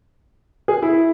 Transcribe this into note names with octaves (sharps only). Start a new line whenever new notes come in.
G#4
E4